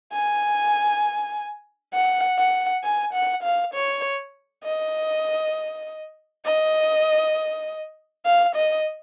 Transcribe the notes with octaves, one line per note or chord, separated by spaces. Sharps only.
G#5
F#5
F#5
G#5
F#5
F5
C#5
D#5
D#5
F5
D#5